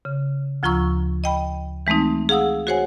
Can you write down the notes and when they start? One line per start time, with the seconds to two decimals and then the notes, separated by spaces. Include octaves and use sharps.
0.05 C#3
0.63 D2 F3 F4 A#5 C#6 E6
1.24 D#5 G5 B5
1.87 E3 G#3 A3 C4 D#4
2.29 G#4 F5 F#5 D#6 E6
2.67 F#4 G#4 C5 C#5 F#5 G#5